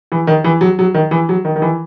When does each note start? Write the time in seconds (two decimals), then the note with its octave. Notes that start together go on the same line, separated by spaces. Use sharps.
0.12 E3
0.27 D#3
0.44 E3
0.61 F#3
0.79 F#3
0.94 D#3
1.11 E3
1.29 F#3
1.45 D#3
1.56 D#3
1.62 E3